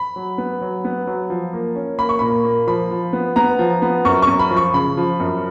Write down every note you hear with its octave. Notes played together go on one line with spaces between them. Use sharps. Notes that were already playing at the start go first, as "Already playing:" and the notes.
Already playing: B5
F#3
B3
F#3
B3
F#3
F3
A#3
C#4
A#3 B5
C#6
A#2 B5
A#3
F3 B5
F3
B3
B3 A#5
F3
B3
F#2 C#6
C#6
F#2
B5
F3
C#6
C#3 B5
F3
F#2